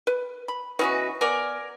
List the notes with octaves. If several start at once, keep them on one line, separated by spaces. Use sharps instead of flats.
B4
B5
E3 B3 C#4 D#4 F#4 B4
B3 A#4 D5 G#5